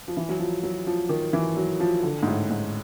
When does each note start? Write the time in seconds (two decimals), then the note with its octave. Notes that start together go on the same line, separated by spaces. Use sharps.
0.08 F3
0.17 E3
0.29 F#3
0.39 F3
0.63 F#3
0.87 F3
1.09 D#3
1.33 E3
1.57 F#3
1.80 F3
2.03 D3
2.23 G#2
2.27 A2
2.50 G#2